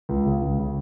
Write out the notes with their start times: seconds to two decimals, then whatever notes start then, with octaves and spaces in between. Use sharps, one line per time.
0.09 C#2
0.26 C#3
0.42 C#2
0.59 C#3